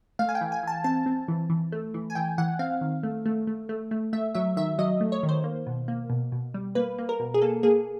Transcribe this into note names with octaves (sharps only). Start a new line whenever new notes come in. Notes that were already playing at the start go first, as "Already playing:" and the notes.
A3 F5
G#5
G5
E3
G#5
E3 A5
C4 A5
C4
E3
E3
A3
E3
G#5
E3 G5
E3 F#5
C4 F5
D#3
A3
A3
A3
A3
A3
A3 E5
F#3 E5
D#3 E5
F#3 D#5
A3
C#5
D#3
C5
A#3
B2
A#3
B2
B2
G3
A#3 B4
A#3
A#4
B2
G#4
A#3 A4
A#3 G#4